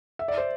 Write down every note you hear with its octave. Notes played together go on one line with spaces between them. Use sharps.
E5
D5
C5